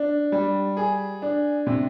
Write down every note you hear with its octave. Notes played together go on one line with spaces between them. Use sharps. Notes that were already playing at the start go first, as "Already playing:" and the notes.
Already playing: D4
G3
G#4
D4
C3